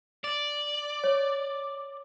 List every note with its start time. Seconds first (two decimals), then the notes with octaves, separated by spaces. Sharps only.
0.24 D5
1.04 C#5